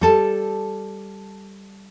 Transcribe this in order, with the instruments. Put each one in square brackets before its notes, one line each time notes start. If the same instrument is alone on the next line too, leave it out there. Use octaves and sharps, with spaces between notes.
[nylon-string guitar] G3 A4 A5